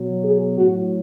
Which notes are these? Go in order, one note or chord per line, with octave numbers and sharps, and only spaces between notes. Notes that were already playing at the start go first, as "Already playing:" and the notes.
Already playing: B2 F#3
G#4
A2 F#3 F#4